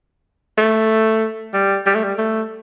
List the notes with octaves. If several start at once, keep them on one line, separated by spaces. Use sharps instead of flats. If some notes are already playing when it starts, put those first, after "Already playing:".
A3
G3
G3
A3
G3
A3